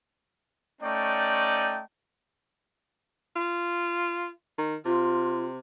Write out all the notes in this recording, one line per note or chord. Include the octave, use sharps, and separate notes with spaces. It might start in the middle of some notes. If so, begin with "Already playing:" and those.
A3 C#4 D#4 D5 G5
F4
D#3
C3 F4